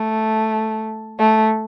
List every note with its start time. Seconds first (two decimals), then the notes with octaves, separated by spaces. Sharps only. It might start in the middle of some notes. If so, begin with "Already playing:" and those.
Already playing: A3
1.19 A3